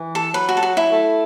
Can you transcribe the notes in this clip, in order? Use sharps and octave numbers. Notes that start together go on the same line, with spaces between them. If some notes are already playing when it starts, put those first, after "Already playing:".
Already playing: E3
A4
F#3 B4
F#4
A4
F#4
E4
A3